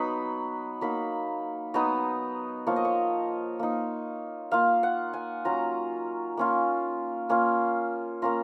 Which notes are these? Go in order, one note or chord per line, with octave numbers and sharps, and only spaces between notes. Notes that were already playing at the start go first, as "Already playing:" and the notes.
Already playing: F#3 B3 D#4 B5
F#3 A#3 D#4 B5
F#3 B3 D#4 A#5
F3 A#3 F4 C#5
D#5
C#5
A#3 D#4
A#3 F4 F5
F#5
G#5
F#3 C#4 F4 A#5
A#3 C#4 F4
A#3 C#4 F4
A#3 C#4 F4 A#5